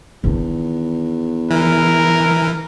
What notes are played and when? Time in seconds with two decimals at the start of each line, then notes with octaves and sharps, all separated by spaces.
0.24 E2 D#3 D4
1.51 E3 A#4